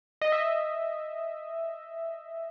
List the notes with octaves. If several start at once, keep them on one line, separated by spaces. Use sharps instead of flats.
D#5
E5
D#5